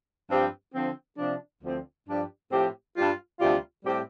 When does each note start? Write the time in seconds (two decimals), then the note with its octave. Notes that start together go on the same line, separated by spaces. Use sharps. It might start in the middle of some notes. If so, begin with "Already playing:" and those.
0.29 G2 F3 C4 G4
0.74 D3 F3 C4
1.18 C3 F3 D4
1.62 D2 D3 F3 C4
2.07 G2 F3 D4 G4
2.51 A2 F3 C4 G4
2.96 G2 G3 F4
3.40 D2 C3 G3 F4
3.84 A2 G3 C4 G4